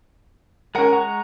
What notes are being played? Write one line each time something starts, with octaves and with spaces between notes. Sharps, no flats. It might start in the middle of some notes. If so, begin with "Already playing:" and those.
G#3 C#4 A#4 F#5
G#3 F#5 A#5 C#6